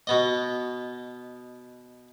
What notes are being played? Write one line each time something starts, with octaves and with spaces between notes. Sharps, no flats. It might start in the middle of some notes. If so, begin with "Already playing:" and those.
B2 B3 D#5